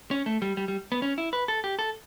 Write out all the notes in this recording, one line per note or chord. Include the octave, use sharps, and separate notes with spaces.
C#4
A3
G3
G3
G3
B3
C#4
E4
B4
A4
G4
A4